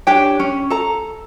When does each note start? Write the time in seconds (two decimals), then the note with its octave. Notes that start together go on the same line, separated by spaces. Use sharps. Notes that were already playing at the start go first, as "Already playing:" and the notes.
0.07 D4 G4 C#5 G5
0.40 C#4
0.70 A4 A#5